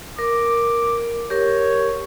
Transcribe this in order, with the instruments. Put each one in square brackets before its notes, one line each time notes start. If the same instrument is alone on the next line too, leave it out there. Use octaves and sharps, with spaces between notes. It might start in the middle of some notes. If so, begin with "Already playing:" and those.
[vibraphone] A#4 [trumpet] D6
[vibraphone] G4 A#4 [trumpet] C#5